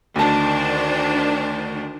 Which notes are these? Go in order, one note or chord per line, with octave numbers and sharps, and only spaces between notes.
D2 D#3 D4 C5 A5